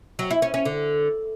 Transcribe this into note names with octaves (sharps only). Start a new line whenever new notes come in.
F#3
E4
C#4
C#4
D3